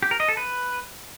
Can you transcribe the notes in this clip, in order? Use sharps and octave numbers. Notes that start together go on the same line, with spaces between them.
G4
A#4
D#5
A4
B4